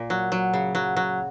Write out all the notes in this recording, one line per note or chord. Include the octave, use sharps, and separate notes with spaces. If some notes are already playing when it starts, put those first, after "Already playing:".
Already playing: A#2
F#3
F#3
C#3
F#3
F#3